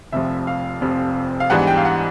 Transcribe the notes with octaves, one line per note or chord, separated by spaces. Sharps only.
F1 F2 C3 F3 E5
F5
F1 F2 C3 F3
F5
G#2 E3 G3 B3 D4 F#5
G5
F5
F#5